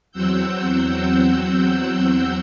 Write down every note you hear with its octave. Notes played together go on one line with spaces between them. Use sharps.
E2 F#3 C4 F#5 E6 G6